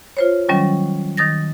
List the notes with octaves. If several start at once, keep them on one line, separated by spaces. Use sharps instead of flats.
F4 C5 C#5
D#3 F#3 G3 C#4
D#3 D#6 A6 A#6